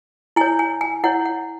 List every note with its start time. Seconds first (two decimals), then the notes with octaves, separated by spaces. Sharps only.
0.36 E4 G#5
0.41 C#5
0.59 G#5
0.81 G#5
1.04 E4 C#5 F#5
1.25 F#5